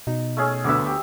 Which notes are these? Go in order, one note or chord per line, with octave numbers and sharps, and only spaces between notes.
B2 D#4
A3 C#4 G#4
D2 D3 B3 E5 D6
G4